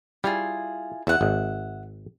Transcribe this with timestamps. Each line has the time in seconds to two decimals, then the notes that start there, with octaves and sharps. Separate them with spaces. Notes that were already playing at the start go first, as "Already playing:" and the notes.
0.24 G3 E4 F4 G#4
1.07 E2 E5 F#5
1.21 G#1